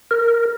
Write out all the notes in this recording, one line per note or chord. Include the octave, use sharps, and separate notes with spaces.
A#4